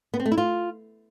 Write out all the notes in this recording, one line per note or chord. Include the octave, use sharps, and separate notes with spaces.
B3
C4
A3
E4
F4